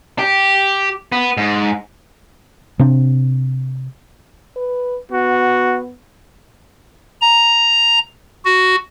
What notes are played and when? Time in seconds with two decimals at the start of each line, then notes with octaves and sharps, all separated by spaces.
0.19 G4
1.12 B3
1.37 G#2
2.79 C3 C4 D4
4.56 B4
5.12 B3 F#4
7.21 A#5
8.45 F#4